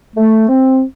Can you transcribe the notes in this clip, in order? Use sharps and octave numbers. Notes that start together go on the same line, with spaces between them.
A3
C4